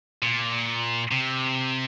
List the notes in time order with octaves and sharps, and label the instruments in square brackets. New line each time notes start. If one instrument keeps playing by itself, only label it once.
[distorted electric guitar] A#2
C3